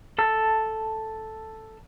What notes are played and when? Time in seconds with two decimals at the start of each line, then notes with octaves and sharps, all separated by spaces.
0.18 A4 A5 E6